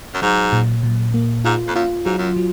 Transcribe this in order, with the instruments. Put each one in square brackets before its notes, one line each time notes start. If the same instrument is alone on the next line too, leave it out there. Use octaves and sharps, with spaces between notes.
[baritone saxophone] F#2
[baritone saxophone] G#2 [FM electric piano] F#3
[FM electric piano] A#2
A#2
A#3
[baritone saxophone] G#2 [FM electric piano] F4
[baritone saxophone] F2
[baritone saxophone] F#2 [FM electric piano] F4
[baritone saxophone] G#2 [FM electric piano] F#3
[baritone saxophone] F#2
[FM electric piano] F#3